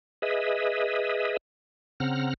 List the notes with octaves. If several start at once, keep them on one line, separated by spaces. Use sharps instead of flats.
G#4 B4 D#5 E5
C#3 C4 F#5 A#5 F6